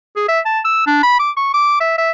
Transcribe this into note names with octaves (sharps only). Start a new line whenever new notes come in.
G#4
E5
A5
E6
D4
B5
D6
C#6
D6
E5
E5